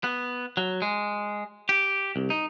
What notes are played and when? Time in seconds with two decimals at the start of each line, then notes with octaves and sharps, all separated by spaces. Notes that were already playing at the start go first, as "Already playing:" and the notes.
0.04 B3
0.57 F#3
0.82 G#3
1.69 G4
2.16 C2
2.30 D#4